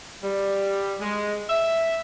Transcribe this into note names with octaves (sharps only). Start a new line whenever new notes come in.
G3
G#3
E5